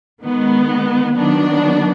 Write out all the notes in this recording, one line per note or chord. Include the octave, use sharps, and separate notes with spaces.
D#3 G#3 B3
D#3 F#3 B3 D4